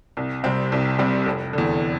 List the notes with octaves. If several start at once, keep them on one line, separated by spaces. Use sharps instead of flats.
C2
C3 G3 C4
C2
C3 G3 C4
F1
E2 D3